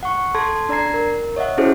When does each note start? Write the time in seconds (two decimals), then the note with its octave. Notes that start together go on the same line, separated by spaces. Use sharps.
0.03 F#5 C#6
0.35 A4 A5 C6 G#6
0.69 D4 D5 A#5 G#6 C7
0.94 A#4
1.36 C#5 D#5 E5 F#5
1.58 C#4 E4 F#4 G#4 A4 C5